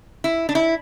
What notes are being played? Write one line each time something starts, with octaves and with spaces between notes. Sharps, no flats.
E4
D4
E4